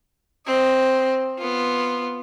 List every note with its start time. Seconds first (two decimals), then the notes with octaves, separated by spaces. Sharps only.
0.47 C4 D#5
1.38 B3 F4